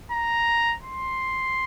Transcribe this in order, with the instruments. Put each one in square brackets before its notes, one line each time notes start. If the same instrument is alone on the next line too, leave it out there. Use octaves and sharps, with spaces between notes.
[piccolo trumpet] A#5
C6